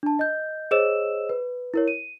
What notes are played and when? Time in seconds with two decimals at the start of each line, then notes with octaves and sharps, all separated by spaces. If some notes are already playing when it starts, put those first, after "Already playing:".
0.03 D4 A5
0.19 D#5 G6
0.71 G#4 C5 C#5 D#5 E6 E7
1.29 B4
1.74 E4 A#4 C#5
1.88 D#7